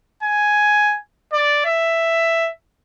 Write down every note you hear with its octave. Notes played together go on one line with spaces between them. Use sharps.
G#5
D5
E5